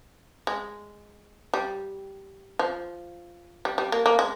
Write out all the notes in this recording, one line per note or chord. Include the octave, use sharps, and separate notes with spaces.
G#3
G3
F3
G3
G3
A#3
A#3
G#3